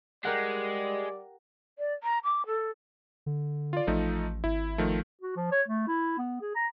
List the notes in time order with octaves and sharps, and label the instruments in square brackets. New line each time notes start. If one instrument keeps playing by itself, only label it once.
[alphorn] G3 [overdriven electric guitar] G#3 [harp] G4 A#4 F#5 [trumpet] D5
[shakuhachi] D5
A#5
D6
A4
[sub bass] D3
[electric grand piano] F4 D5
[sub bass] A1 [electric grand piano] F3 A3 D#4
[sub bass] G#1 [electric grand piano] E4
[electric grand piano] D#3 F3 A3
[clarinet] F#4
F3
C#5
A3
E4
B3
G#4
A#5